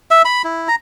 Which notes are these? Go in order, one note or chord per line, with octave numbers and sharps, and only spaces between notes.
E5
B5
E4
A#5